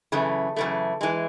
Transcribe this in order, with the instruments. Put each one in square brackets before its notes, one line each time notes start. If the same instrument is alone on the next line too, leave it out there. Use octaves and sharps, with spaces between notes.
[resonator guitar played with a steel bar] F#2 C#3 E3 A3
F#2 C#3 E3 A3
E3 G#3